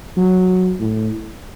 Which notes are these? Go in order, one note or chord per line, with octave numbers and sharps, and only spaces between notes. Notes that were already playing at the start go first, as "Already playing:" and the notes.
F#3
A2